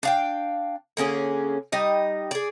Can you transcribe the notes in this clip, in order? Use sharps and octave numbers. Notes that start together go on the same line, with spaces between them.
D4 F5 G5
D3 A#3 C#4 G#4
G3 D#4 D#5
G#4 D5